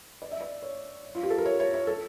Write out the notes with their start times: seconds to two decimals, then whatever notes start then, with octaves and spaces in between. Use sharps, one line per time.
0.22 D5
0.31 E5
0.41 D5
0.62 C#5
1.15 F4
1.23 G4
1.30 A4
1.38 A#4
1.45 C#5
1.60 C#5
1.74 C#5
1.87 A4